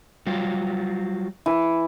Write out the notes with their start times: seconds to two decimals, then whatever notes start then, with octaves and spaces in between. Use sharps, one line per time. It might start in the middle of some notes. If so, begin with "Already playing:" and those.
0.27 F#3 G3 F4
1.46 E3